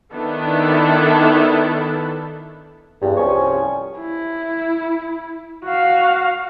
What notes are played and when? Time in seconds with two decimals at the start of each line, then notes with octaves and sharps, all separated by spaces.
0.13 D#3 B3 D4 E4 A4
3.02 E2 G2
3.17 C2 F3 G3 C#4 G#5 C#6
3.98 E4
5.64 F#4 F5